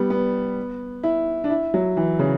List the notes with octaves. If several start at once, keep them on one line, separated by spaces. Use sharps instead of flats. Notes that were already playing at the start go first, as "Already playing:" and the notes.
Already playing: G3 B3
B3
E4
D4
E4
F#3
E3
C#3